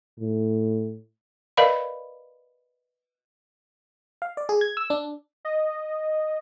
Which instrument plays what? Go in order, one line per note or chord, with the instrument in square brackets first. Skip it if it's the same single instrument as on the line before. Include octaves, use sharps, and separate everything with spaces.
[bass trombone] A2
[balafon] A#4 B4 D5 D#5 F5 B5
[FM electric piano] F5
D5
G#4
G#6
E6
D4
[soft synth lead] D#5